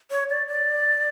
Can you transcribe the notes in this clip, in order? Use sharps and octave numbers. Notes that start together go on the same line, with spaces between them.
C#5
D5
D5